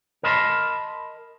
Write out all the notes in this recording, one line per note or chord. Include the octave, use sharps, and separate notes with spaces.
A#4 D#5 A5 B5 C6